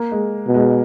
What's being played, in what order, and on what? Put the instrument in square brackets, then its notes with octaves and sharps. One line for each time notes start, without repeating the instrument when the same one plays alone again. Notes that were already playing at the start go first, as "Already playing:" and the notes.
Already playing: [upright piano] A#3
G#3
[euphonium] B2
[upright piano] G#3